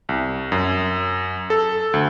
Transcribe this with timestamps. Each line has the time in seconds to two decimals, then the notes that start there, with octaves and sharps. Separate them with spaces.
0.09 C2
0.52 F#2
1.50 A4
1.94 D2